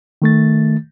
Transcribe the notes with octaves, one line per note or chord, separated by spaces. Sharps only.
D#3 A3 A6